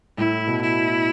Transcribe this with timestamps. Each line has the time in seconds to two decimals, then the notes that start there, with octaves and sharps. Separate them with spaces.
0.18 A2 E4
0.47 B2
0.61 E4